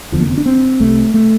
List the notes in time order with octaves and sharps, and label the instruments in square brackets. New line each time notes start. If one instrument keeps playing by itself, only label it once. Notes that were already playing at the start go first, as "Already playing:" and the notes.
[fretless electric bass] F1 E2 D3 F3
A#3
C4
D4
C4
C2 C3 A3
A3